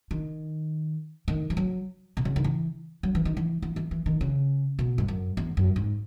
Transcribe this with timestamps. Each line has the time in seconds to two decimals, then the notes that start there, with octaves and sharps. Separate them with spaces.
0.11 D#3
1.28 D#3
1.50 E3
1.57 F#3
2.17 B2
2.25 C#3
2.36 D#3
2.44 E3
3.03 F#3
3.15 E3
3.25 D#3
3.37 E3
3.62 E3
3.76 E3
3.91 E3
4.06 D#3
4.21 C#3
4.79 B2
4.98 G#2
5.08 F#2
5.37 E2
5.57 F#2
5.76 G#2